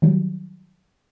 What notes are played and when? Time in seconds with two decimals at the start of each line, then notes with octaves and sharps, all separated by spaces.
0.02 D#3 F#3 G3